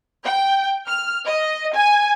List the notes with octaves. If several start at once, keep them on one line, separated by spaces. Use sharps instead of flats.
G5
F6
D#5
G#5